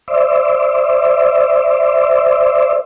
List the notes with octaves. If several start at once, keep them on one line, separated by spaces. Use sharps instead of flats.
C5 D5 E5